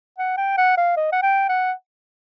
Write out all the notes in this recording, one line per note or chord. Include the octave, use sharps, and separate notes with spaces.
F#5
G5
F#5
F5
D#5
F#5
G5
F#5